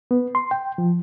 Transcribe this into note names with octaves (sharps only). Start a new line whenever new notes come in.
B3
C6
G5
F3